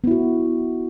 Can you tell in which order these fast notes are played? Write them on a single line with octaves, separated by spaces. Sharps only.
B3 E4 F#4